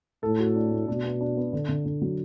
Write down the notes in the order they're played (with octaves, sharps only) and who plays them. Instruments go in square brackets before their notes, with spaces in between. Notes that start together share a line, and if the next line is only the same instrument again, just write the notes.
[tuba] A2 [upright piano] A4
[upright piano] F#4
D4
A3
[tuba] B2 [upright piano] D4
[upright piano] B3
D4
B3
D3
D3
D3
F#3